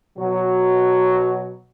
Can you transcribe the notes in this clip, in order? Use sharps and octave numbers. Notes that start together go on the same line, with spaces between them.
B2 F#3